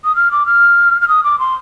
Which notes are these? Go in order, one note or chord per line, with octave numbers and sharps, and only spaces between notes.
D#6
F6
D6
F6
F6
D#6
D6
C6